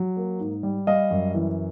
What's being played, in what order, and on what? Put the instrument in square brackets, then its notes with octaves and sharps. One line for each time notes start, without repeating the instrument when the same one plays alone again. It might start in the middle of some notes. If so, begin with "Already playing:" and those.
Already playing: [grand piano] F#3
A#3
G#2
G3
G3 D#5 F5
F#2
E3